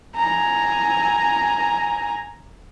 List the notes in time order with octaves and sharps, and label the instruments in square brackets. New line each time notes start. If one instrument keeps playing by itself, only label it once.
[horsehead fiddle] G#5 A#5